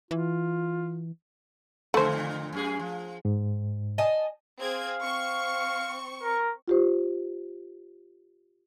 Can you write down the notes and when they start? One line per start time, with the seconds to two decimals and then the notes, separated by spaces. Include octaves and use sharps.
0.11 E3 F4
1.94 F2 A#2 D3 A3 C5
2.53 F#2 G#4
2.79 F3
3.25 G#2
3.98 D#5 G#5 A5
4.61 C4 G#4 F5 G#6
5.00 C4 C#6 C#7
6.23 A#4
6.68 F4 G4 C5